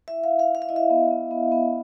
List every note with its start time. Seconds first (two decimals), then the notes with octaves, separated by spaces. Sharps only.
0.08 E4 E5
0.24 E4 F5
0.39 F5
0.50 E4
0.55 F5
0.62 E5
0.69 E4 D#5
0.76 E5
0.90 B3
1.11 B3
1.31 B3
1.52 B3